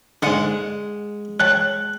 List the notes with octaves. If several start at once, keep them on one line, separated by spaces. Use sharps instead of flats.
G#2 D3 G#3 F#5
C#5 G5 A5 F#6